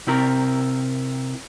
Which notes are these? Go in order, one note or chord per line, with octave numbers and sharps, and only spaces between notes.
C3 C4 E4 A#4